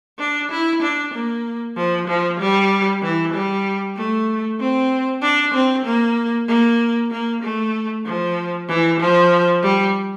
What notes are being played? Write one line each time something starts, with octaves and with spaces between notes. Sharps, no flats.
D4
E4
D4
A#3
F3
F3
G3
E3
G3
A3
C4
D4
C4
A#3
A#3
A#3
A3
F3
E3
F3
G3